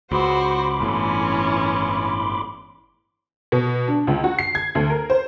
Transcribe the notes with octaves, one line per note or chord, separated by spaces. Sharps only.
C#2 F#4 C5 B5 C6 D6
G1 A2 E3 C#4
B2
D4
C#2
F#4
C7
G#6
D2
A#4
C5